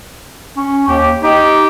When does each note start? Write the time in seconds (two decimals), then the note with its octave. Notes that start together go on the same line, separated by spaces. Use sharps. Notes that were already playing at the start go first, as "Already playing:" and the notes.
0.57 C#4
0.88 D#2 G4
1.23 D#4 G4